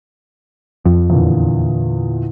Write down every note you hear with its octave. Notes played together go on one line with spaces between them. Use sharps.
F2 F3
E2 A#2 D3